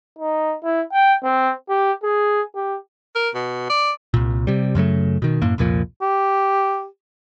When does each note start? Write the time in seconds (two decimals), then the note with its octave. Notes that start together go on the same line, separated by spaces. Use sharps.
0.19 D#4
0.63 E4
0.93 G5
1.24 C4
1.69 G4
2.04 G#4
2.55 G4
3.15 A#4
3.35 B2
3.70 D5
4.14 C2 A#2
4.47 C3 G3
4.75 F#2 C#3 F#3 A3
5.22 B2 D#3
5.42 F#2 A2 A#3
5.58 C2 F2 A#2 F3
6.02 G4